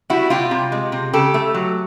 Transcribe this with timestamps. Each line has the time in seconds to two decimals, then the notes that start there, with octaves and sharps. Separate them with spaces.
0.10 G3 E4 F#4
0.30 C3 F4 G4
0.51 C3
0.72 G#3
0.92 C3
1.13 C#3 G4 A4
1.34 A3
1.55 F#3